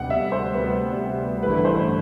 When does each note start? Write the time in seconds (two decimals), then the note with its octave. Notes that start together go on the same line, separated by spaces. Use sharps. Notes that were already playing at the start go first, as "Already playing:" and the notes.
Already playing: D2 C3 G3 B3 F#5
0.10 E5
0.32 C5
0.54 D2 C3 G3 B3 B4
1.43 A1 G2 D3 A3 E4 B4
1.65 C5